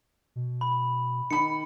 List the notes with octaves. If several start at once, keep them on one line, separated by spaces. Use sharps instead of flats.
B2
B5
D#3 B5 C#7